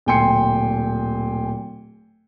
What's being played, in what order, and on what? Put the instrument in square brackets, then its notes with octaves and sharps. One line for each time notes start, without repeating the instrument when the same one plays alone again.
[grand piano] D1 A#2 G5 G#5 C6 C#7